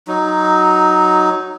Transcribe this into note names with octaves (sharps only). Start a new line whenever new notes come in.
F#3 D#4